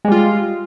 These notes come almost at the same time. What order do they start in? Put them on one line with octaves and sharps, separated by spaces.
G#3 G3 F4